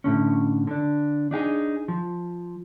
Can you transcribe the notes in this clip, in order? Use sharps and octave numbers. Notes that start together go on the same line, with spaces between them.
A2 D3 C#4
D3 D4
D4 D#4 G4 G#4
F3